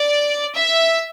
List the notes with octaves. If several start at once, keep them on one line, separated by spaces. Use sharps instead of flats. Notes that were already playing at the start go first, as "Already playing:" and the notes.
Already playing: D5
E5